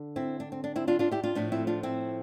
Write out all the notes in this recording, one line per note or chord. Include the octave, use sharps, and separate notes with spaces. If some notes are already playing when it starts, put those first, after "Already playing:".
Already playing: D3
C4 E4
D4
C4
D4
C4 E4
D4 F4
D4 F4
E4 G4
D4 F4
A2 F3 A3 D4
C4 E4
D4 F4
C4 E4